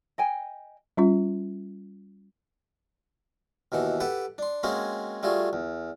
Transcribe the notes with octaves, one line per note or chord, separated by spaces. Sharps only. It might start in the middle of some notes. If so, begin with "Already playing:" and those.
D#5 G5 G#5
G3 C#4 F4
D#2 B2 E3 F#5
G4 A4 B4 F#5 G5
D4 C6
G#3 A#3 C4 C#4 F#4 G#4
G3 A3 F4 F#4 G#4
E2